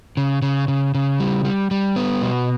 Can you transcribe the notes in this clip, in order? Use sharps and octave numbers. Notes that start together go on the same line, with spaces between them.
C#3
C#3
C#3
C#3
G3
G3
G3
B3
B2